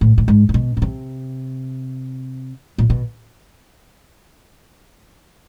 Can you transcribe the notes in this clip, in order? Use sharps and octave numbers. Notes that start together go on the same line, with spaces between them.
A2
A2
G#2
A#2
B2
B2
C3
A#2
B2